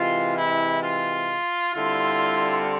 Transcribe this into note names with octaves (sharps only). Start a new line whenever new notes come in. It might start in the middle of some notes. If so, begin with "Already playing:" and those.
Already playing: C3 E3 G#3 F4
E4
F4
D3 G3 C4 E4 F4